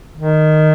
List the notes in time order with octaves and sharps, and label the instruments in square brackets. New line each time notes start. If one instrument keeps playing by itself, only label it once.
[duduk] D#3